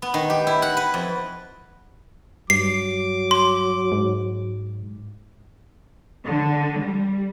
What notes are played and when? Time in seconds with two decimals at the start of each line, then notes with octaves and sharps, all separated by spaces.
0.02 B3
0.14 D#3
0.30 G4
0.47 E4
0.62 F#5
0.77 B4
0.94 F2
2.50 G2 F#3 D6 C7
3.31 C6
3.92 G#2
6.25 D3
6.80 G3